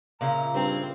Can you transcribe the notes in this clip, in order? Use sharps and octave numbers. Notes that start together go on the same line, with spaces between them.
A#2 C#3 E4 A#5
G2 C4